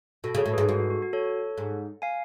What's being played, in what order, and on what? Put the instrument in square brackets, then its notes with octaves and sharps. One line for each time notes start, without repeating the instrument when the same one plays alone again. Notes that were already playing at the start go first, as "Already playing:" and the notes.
[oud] B2 [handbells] F#4 A4
[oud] C#3
[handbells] A4 C#5
[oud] A2
[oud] G#2 [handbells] G#4 B4
[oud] G#2 [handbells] F#4 A4
[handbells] F#4
F#4
F#4
A4 C#5
[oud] G#2
[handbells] F5 G#5